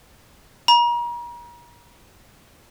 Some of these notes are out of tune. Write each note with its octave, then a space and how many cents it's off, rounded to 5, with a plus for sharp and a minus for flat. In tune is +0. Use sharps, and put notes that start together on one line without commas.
A#5 +40